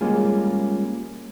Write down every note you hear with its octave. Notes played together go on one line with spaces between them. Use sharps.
G3 G#3 A#3 C#4 F4 G#4